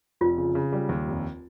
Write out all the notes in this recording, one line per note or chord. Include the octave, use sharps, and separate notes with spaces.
F1 F4
C#3
C#3
G3
D#2
F1